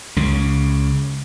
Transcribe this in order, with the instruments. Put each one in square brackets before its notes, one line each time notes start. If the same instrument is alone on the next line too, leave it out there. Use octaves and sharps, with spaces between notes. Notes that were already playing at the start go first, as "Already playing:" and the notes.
[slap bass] C#2 C#3